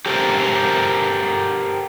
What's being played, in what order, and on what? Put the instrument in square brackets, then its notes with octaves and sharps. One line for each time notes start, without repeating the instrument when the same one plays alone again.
[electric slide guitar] G4 A4 A#4 C5